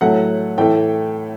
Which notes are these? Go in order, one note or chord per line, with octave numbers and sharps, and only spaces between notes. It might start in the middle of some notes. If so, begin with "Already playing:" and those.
A2 F#3 A3 F#5
A2 E3 A3 G5